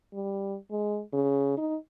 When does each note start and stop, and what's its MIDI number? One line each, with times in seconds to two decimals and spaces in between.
0.13 0.56 55
0.71 1.01 56
1.13 1.56 49
1.57 1.76 63